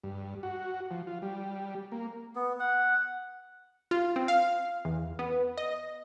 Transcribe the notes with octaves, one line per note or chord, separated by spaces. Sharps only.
G2
F#4
F3
F4
G3
A#3
B3
F#5
F4
C4
F5
E2
B3
D#5